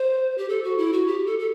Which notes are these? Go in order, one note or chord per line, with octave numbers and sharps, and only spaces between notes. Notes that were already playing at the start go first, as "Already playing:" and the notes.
Already playing: C5
G4
A4
F#4
E4
F#4
G4
A4
A4